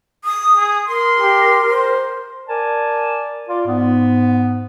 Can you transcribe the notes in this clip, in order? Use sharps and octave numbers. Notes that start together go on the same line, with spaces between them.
D#6
G#4
A#4 C6
G4
C5
A#4 D5 G#5 A5
F4 D5
G#2 B3